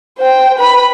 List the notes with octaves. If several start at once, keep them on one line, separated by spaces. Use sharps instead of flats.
C5 G5
B4 B5